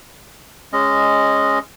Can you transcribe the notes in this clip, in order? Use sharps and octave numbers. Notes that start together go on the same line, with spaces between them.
G#3 C#4 D#5